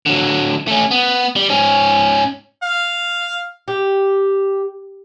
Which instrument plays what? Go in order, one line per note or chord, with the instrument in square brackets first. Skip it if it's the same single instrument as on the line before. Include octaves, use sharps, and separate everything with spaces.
[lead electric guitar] D3 F#3
A3 C#4
B3
G3
G#2 C#4
[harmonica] F5
[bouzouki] G4